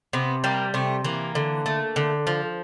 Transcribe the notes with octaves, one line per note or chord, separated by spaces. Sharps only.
C3 B3
G3 A#3
C3 A3
E3 A#3
D3
A3
D3
F3